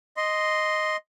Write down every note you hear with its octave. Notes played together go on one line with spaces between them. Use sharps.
D#5 C6